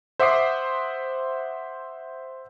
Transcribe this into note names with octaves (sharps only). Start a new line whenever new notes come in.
C5 E5 F#5 D6 D#6 C7